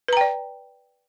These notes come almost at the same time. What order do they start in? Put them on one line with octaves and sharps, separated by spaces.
B4 A#5 G5 D5